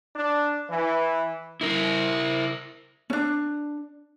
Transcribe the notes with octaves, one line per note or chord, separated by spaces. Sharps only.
D4
E3
E4 A#4
C#4 D4